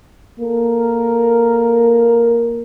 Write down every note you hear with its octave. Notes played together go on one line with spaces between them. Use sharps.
A#3 A4 A#4